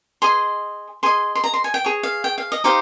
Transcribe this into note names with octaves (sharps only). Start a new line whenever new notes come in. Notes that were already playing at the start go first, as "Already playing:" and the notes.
G#4 D#5 C6
G#4 D#5 C6
C6
A#5
C6
G#5
G5
G#4 C#5
F5
G5
F5
D#5
D#4 G4 C5 D#5 F5